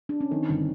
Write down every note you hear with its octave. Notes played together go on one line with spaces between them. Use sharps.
D4
C#4
D#3 C4
G1